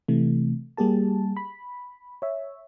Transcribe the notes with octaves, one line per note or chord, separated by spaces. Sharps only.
C3 E3 A3
G3 A#3 G4 G#4 A5
B5
C#5 E5